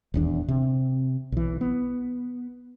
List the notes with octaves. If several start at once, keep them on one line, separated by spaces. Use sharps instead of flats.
D#1 E2 D4
C3
B1 E3
B3